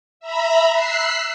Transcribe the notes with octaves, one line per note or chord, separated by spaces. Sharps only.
E5 A#5 B5
E6 F#6 B6 C7